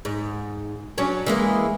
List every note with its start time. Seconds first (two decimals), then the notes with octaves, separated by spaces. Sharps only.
0.05 G#2
0.98 F#3 C#4 D4
1.26 E3 G#3 A#3